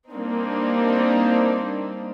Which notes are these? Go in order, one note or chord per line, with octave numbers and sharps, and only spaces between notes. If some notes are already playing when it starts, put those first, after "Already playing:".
G3 A#3 C4 D4 D#4